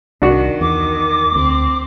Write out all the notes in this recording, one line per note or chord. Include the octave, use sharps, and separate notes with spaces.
C2 D#3 D4 F#4
E2 D6
D2 C4